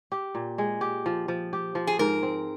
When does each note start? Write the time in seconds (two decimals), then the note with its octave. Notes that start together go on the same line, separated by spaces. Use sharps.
0.12 G4
0.35 A#2
0.58 G#3
0.81 G4
1.06 F3
1.28 F3
1.53 G4
1.75 F3
1.87 G#4
1.99 G#2 A#4
2.23 C4